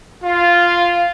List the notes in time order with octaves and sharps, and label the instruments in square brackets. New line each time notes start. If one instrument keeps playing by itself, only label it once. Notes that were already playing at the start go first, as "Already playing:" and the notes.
[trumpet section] F4